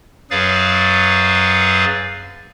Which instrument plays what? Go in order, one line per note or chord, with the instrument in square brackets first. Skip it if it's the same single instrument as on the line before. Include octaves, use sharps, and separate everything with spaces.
[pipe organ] F#2 F#3 G#4 B4 F5 A6